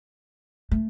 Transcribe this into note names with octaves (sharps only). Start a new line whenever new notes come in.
A3